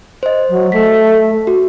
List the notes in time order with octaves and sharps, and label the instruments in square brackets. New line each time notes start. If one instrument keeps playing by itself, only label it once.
[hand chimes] C5 D#5
[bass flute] F#3
[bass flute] A3 [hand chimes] B6
[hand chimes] F#4